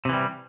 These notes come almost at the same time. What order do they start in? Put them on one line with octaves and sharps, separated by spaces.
C3 E3 G3